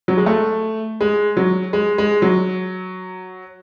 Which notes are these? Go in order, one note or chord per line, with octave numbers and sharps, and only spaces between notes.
F#3
G#3
A3
G#3
F#3
G#3
G#3
F#3